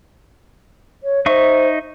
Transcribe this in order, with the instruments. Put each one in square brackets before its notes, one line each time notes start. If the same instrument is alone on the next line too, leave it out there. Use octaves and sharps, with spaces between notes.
[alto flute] C#5
[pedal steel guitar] D#4 E5 C#6 [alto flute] C5